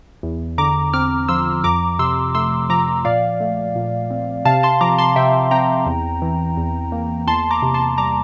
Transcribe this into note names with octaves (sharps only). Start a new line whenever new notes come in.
E2
D3 A#5 D6
C4 D6 F6
F3 C6 E6
F2 A#5 D6
C3 C6 E6
A3 C6 E6
F3 A#5 D6
A#2 D5 F5
A3
A#2
C4
C3 F5 A5
A5 C6
F3 A#5 D6
A5 C6
C3 E5 G5
C4 G5 A#5
E2
E3
E2
A#3
E2 A5 C6
A#5 D6
C3
A5 C6
G3 A#5 D6